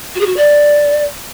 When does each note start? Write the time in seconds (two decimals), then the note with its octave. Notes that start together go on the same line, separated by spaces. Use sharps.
0.14 F#4
0.20 G#4
0.25 F#4
0.36 D5